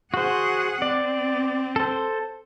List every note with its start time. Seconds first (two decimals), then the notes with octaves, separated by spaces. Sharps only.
0.14 F#4 G#4 C5 F#5
0.82 C4 D5
1.76 A4 C5